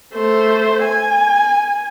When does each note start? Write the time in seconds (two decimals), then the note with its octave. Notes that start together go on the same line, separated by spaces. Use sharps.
0.13 A3 C5
0.84 G#5